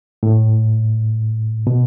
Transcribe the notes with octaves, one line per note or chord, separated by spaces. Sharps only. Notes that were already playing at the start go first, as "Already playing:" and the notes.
A2
B2